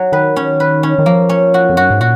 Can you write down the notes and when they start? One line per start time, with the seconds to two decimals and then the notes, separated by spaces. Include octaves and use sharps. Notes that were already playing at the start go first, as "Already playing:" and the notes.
Already playing: F#3
0.12 D#3 B4
0.36 C#4
0.60 B4
0.83 C#4
0.99 D#3
1.06 F3 A#3
1.29 C#4
1.54 F#4
1.70 F2
1.77 F#2 F#4
1.90 G#2
2.01 A#2 F#4